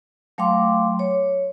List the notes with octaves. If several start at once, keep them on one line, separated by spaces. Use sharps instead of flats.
F#3 A3 F5 G5 C6 D6
C#5